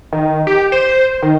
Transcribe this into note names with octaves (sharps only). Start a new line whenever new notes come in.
D#3
G4
C5
D#3